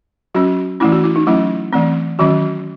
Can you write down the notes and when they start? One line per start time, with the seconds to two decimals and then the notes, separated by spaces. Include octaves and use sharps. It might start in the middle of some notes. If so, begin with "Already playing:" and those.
0.35 F#3 C#4 F#4
0.80 E3 A3 C#4 E4
0.92 F#4
1.04 E4
1.16 D#4
1.27 F#3 A3 C#4 E4
1.73 E3 A3 C4
2.19 D#3 F#3 C#4 F#4